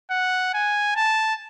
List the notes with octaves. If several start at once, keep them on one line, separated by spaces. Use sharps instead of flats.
F#5
G#5
A5